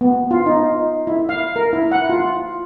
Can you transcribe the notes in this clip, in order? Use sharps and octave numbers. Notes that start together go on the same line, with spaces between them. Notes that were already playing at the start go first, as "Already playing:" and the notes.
B3
F4
D#4
E4
F5
A#4
E4
F#5
F4